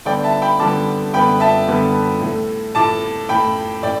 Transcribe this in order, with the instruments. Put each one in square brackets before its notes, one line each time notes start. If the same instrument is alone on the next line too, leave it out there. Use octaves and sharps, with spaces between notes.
[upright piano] D3 G3 B3 D5 G5
E5 A5
G5 B5
D3 G3 B3 A5 D6
D3 G3 B3 G5 B5
E5 A5
D3 G3 B3
A2 A3
A2 A3 A5 D6
A2 A3 G5 B5
A2 D5 G5